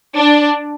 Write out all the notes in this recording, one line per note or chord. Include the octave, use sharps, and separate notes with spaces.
D4